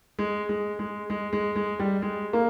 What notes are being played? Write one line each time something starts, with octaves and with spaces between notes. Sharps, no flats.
G#3
G#3
G#3
G#3
G#3
G#3
G3
G#3
A#3